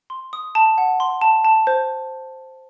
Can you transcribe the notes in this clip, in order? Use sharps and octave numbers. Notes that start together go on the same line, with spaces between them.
C6
D#6
A5
F#5
C6
A5
A5
C5